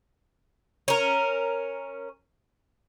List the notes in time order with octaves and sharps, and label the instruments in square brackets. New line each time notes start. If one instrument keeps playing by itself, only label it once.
[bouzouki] C#4 A#4